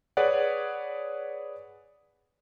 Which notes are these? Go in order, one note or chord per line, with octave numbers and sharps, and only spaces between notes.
G#4 B4 C#5 D5 F#5